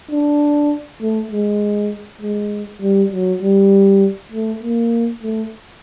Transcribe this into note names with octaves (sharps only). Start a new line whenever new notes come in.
D4
A3
G#3
G#3
G3
F#3
G3
A3
A#3
A3